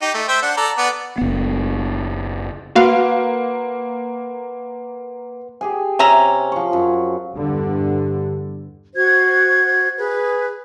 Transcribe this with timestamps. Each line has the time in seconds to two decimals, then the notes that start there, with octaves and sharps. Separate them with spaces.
0.02 D#4 G4
0.14 A3
0.29 C5 E5 G5
0.42 D4 F#5
0.57 A4 D5 A#5
0.78 B3 D5 F#5
1.18 F#1 B3
2.75 A#3 F#4 B4 F5 F#5 C6
5.61 G4 G#4 G#5
5.99 C3 C#4 E5 A#5
6.52 F3 C#6
6.73 F#2
7.33 E2 G2 D3 G3
8.96 F#4 C5 G#6
9.97 G#4 B4